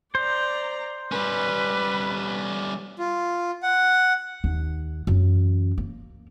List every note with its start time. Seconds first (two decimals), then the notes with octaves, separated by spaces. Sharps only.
0.15 C5 D5 A#5
1.12 G3 C#4 B4
2.99 F4
3.62 F#5
4.44 D#2
5.07 F#2 E3
5.78 A#3